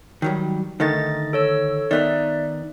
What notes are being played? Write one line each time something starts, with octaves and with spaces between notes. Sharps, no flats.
D#3 F#3 G3
D3 D#3 A3 D#4 D#5 A6
A4 C#5 E6
D#3 B3 D#4 D5 E5 F#6